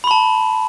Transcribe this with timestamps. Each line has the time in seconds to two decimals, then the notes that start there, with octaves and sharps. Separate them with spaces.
0.04 B5
0.07 C6
0.11 A5